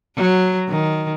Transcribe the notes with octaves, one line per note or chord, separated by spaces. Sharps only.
F#3
D#3